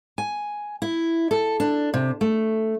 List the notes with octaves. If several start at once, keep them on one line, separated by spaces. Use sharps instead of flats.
G#5
E4
A4
D4
C3
A3